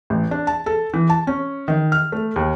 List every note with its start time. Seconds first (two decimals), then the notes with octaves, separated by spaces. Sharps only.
0.10 A1
0.31 D4
0.47 A5
0.66 A4
0.94 E3
1.10 A5
1.27 C#4
1.68 D#3
1.92 F6
2.12 A3
2.36 D#2